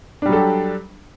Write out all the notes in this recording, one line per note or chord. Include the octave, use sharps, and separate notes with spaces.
F#3 G3 D4 G4 A4